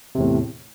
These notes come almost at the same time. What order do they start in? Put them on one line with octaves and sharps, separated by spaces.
C3 E2 A2